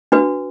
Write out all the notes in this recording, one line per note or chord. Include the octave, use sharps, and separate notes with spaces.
D4 F#4 B4